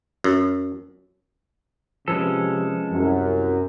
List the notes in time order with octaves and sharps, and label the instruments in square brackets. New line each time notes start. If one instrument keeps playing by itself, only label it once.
[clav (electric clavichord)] F#2
[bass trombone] C3 [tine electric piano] F3 B4 [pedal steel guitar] G#3 C#4 A4
[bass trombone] C2 [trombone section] F#2